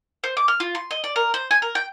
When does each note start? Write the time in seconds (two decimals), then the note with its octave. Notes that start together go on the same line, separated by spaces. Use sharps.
0.24 C5
0.37 D6
0.48 F6
0.60 F4
0.75 C6
0.91 D#5
1.04 D5
1.16 A#4
1.34 C5
1.51 G#5
1.62 A#4
1.75 G5